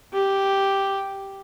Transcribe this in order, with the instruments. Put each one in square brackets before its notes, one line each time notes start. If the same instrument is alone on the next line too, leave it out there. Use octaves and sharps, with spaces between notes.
[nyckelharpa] G4